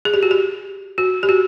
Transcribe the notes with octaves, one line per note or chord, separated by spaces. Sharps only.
G#4
G4
F#4
G4
F#4
G4
F#4